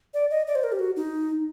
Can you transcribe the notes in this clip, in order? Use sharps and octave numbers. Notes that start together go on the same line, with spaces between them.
D5
D#5
D5
C5
A#4
G4
F#4
D#4